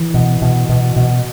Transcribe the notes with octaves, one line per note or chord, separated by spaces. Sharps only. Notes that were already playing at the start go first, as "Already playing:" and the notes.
Already playing: E3
B2
B2
B2
B2